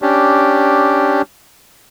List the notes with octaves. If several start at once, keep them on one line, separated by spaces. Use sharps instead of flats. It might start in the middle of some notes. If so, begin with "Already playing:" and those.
C#4 D4 G4